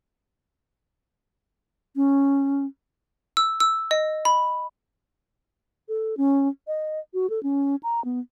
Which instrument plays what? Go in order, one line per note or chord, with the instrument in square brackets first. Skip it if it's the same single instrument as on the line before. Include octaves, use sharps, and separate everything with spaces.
[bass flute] C#4
[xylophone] E6
E6
D#5
B5
[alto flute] A4
C#4
D#5
F#4
A4
C#4
A#5
B3